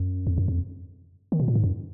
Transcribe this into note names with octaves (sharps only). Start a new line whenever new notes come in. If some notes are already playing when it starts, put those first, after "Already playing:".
Already playing: F#2
F2
F#2
F2
D#3
B2
A#2
G#2
F#2